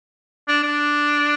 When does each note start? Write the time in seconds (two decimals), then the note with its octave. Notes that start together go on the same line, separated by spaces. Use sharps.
0.48 D4
0.63 D4